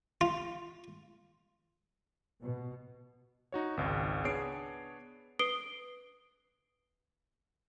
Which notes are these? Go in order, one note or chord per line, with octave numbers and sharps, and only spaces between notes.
F4
B2
D#4 F#4 C#5
G#1 C#2
B3 D4 G#4 C#5 C7 D7
B4 D#6 C7 D7 G7